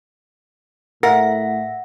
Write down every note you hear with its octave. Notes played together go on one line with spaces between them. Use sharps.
A2 A#4 E5 F#5 A#6